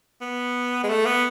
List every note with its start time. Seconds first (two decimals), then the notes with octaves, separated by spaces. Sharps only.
0.21 B3
0.84 G#3
0.89 A3
1.06 B3